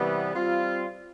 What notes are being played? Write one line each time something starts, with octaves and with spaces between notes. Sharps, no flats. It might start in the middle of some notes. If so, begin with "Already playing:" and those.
Already playing: C3 E3 G3 B3
G3 C4 F4